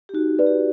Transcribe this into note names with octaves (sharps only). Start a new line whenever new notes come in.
G4
D#4 F#4
F#4 B4 D5
G4